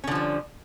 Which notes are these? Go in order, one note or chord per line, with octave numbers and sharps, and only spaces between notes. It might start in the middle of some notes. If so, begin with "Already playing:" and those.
D3 F3 G3 C#4